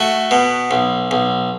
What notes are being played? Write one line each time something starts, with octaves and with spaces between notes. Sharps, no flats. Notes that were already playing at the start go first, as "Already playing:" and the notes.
Already playing: A3 F#4
B2
B1
B1